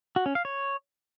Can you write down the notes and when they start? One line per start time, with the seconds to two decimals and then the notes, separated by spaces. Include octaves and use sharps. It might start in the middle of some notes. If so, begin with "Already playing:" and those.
0.16 F#4
0.26 C#4
0.35 F5
0.45 C#5